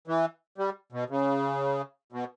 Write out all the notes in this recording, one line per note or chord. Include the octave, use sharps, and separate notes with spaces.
E3
G3
B2
C#3
B2